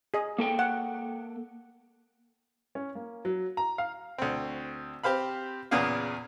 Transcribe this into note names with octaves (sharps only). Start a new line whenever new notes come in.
G#4 D#5
A#3 A4 G5
F#5
C#4
A#3
F#3
A#5
F5
D2 C4
C4 G4 C5 F5 B5
E2 A#2 C#3 B3 G#4 F5